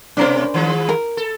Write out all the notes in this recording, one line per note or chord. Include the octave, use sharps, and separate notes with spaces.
B2 A3 C#4 D4 A#4 C5
D#3 F3 G#3
A#4
A4